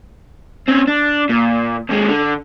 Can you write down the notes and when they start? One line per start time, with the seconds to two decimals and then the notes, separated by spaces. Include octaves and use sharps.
0.69 C4 C#4
0.88 D4
1.29 A#2
1.89 D#2 G#3
2.09 D3